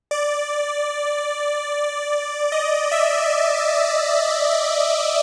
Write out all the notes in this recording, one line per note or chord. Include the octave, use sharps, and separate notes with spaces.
D5
D#5
E5